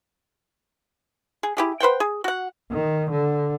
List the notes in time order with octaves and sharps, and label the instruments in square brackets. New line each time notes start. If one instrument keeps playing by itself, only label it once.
[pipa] G#4
E4 G4 G#4
B4 C5 F#5 G5
G#4
F#4 F#5
[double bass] D#3
D3